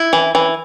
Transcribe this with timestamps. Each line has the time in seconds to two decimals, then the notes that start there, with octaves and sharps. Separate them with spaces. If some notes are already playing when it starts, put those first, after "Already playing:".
Already playing: E4
0.13 E3
0.35 E3